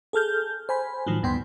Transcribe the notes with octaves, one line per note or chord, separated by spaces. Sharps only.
G#4 A4 F6 G6
C5 G#5 B5
A2 D#3 F3 F#3
D2 G2 B3 G5 C6